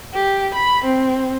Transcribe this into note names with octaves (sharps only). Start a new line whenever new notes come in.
G4
B5
C4